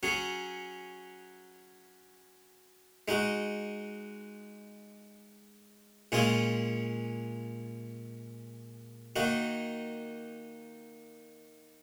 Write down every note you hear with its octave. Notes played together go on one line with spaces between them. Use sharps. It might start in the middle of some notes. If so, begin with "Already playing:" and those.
F#3 C#4 G#4
G#3 D#4 F#4
A#2 G#3 C#4 F4 G#4
D#3 A#3 D#4 F#4